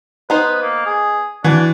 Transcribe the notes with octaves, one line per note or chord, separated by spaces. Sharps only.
B3 D#4 B4 C5
A#3
G#4
E3 D4 F#4